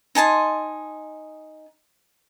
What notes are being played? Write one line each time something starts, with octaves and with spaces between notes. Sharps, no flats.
D#4 G#5 A5 C6